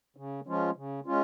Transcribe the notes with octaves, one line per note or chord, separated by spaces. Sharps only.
C#3
F3 G#3 C#4 F4
C#3
G#3 C#4 F4